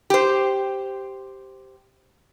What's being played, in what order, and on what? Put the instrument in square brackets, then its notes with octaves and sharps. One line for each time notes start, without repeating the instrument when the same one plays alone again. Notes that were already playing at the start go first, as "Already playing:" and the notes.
[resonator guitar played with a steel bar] G4 C5